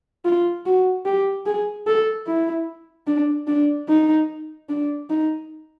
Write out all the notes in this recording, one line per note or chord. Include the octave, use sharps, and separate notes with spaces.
F4
F#4
G4
G#4
A4
E4
D4
D4
D#4
D4
D#4